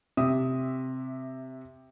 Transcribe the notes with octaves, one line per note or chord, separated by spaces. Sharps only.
C3 E5 D#6